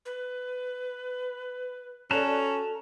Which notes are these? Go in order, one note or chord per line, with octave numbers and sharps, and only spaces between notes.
B4
C#4 F#4 A4 D5 A5 A#5 F#6